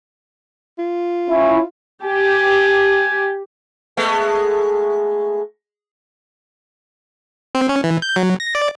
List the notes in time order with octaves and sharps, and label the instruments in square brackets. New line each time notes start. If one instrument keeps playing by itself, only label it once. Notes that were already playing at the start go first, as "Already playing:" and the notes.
[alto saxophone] F4
[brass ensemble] C#4 E4
[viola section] G4 [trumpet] G#5
[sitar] G#3 A3 B3
[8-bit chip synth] C4
C#4
E3
G6
F#3
A#6
D5